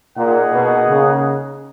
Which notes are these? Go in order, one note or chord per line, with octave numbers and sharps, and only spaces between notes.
A#2 A#3 D#4 G#4 D#5 F#5
B2
C#3